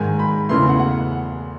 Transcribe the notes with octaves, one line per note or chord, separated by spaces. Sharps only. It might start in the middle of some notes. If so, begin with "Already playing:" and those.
Already playing: G#2 D#3 G#3 G#5
B5
E2 C#3 E3 A3 C6
F#5
F#5